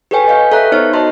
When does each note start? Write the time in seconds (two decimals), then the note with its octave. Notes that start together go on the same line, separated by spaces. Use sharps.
0.11 G4 A4 B4 C#5 G5 G#5
0.28 D#5 F5 G6
0.52 A4 B4 C#5 E5 A#5 F#6
0.71 B3 D#4 G4 C5 C#5 F6
0.93 F#4 C#5 D#5 A5 A#5 C6